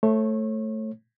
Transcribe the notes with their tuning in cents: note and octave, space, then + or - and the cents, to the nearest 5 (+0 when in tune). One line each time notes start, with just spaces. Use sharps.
A3 +0 C#5 -30